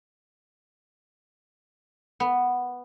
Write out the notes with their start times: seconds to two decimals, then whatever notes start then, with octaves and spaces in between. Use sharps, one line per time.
2.20 B3